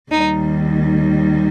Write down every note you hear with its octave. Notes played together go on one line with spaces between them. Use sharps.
D#2 D#3 G3 D#4